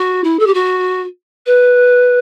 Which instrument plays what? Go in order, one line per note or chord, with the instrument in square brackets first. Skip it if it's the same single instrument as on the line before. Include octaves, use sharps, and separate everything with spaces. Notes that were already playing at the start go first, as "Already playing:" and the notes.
Already playing: [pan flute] F#4
E4
A4
G4
F#4
B4